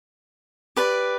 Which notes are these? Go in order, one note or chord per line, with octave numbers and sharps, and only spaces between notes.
G4 B4 D5